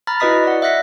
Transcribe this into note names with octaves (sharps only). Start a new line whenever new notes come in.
A#5 B5 F6 A6
E4 F#4 B4 D#5 D#6 B6
D5 F#5
E5 F#5 F#6 A#6 B6